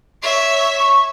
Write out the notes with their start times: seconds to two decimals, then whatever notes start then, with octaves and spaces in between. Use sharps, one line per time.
0.23 C#5 E5
0.79 C#6